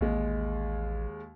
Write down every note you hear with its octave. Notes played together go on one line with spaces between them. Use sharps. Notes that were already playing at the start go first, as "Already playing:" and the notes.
A1 D#2 G#3